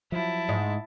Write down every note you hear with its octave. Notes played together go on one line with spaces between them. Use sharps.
F3 F#3 E4 A5
G#2